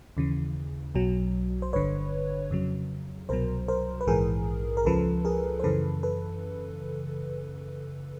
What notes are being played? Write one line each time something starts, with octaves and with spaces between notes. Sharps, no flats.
D#2 C#3 E3
B1 B2 F#3
C5
G1 G2 D3 B4 C#5
F2 C#3 F#3
C2 B2 F#3 A#4 C5
A#4 C5
B4
A#1 G#2 E3 G#4 A#4
A#4
C#2 C#3 F3 A4 B4
G#4 A#4
C5
F#2 C#3 E3 A4 B4
A4 B4